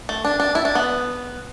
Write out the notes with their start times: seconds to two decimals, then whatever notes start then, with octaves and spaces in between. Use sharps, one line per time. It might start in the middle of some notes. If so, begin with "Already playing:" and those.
0.09 A3
0.24 D4
0.40 D4
0.55 E4
0.65 D4
0.75 B3